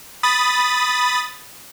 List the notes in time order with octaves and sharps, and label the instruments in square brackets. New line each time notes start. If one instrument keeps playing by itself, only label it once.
[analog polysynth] B5 D#6 A6